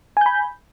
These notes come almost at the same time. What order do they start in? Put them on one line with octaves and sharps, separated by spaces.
G#5 G6 B5